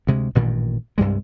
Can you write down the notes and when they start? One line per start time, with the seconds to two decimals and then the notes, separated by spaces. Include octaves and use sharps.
0.07 D2 C3 G#3
0.35 A1 G2 A#2 D#3
0.98 C2 G2 G3 G#3